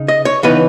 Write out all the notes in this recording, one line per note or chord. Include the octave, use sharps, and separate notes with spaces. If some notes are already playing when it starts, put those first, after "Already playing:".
Already playing: C#3 D#4
D#5
C#5
C#3 E3 B3 D#4 B4